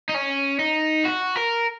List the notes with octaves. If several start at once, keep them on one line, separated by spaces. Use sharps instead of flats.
D#4
C#4
D#4
F#4
A#4